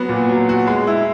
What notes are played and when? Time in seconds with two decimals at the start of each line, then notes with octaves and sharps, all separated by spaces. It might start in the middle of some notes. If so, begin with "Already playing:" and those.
Already playing: F#3 B3 F#4
0.09 A#2
0.29 F#3
0.49 F#4
0.67 G#3
0.87 E4